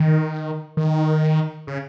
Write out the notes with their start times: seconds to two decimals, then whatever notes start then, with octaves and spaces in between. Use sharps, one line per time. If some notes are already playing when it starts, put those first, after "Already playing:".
Already playing: D#3
0.77 D#3
1.67 C#3